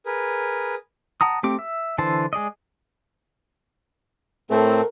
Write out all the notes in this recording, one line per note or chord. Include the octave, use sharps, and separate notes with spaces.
G#4 A#4 B4
F#5 A5 A#5 D#6
A3 C4 G4 D6
E5
D3 E3 C5 A5
G#3 G#4 D5 D#5
A2 A3 C4 A4 A#4